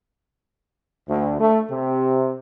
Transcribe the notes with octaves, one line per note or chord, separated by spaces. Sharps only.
D2
A3
C3